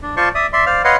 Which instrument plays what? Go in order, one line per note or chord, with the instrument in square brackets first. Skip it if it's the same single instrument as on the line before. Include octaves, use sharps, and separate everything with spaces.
[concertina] D4
F4 C5 D5 A5 C6 C#6
D5 E5 D#6
D5 E5 C6
C5 D5 F5 F6
B4 C#5 D#5 F5 F#5 C6